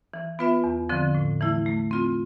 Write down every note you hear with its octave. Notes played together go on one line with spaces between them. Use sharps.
E3
B3 F4 B4 E5
E2
D3 F3 C4
A2
E3 A3 E4
A3
C4 F4